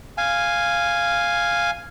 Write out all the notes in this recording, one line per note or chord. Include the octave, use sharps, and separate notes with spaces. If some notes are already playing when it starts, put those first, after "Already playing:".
F5 G#5